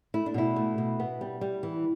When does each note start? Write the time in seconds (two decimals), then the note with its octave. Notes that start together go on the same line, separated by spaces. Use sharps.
0.14 A3 E4
0.26 D4
0.34 B2 E4
0.56 A3
0.78 B2
1.00 B3
1.21 G3
1.41 G3
1.63 E3